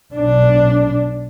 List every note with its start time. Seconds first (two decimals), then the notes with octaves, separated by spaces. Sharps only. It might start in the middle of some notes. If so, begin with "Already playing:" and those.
0.14 B1 D4